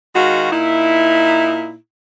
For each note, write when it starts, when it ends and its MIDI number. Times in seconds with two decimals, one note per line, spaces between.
0.15 0.52 51
0.15 0.52 56
0.15 0.52 65
0.15 0.52 66
0.52 1.76 46
0.52 1.76 63
0.52 1.76 64